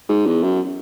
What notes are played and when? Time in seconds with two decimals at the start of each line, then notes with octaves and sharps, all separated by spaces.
0.09 G#2
0.26 E2
0.43 F#2